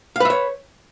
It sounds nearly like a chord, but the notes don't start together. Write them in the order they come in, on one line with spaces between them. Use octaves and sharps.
F5 B4 E5 C#5